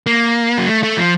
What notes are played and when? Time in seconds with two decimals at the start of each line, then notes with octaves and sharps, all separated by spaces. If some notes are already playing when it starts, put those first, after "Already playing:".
0.06 A#3
0.58 F#3
0.68 A3
0.83 A3
0.97 F3